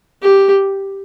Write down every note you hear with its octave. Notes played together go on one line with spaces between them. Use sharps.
G4